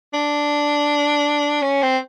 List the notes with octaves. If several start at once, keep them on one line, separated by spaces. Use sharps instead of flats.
D4
C#4
C4